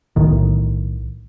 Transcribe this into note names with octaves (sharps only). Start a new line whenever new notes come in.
B1 A2 D#3